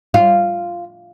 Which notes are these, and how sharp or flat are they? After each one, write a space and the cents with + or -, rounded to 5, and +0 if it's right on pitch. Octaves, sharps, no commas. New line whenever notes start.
F4 -5